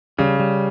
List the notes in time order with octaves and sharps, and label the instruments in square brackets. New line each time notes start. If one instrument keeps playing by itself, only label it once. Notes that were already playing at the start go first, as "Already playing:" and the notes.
[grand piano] C#3 [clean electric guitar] G3
[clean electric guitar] G3